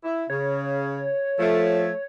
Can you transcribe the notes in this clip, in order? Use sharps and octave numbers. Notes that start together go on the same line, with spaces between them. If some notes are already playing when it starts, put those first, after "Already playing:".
E4
C#3 C#5
F3 A3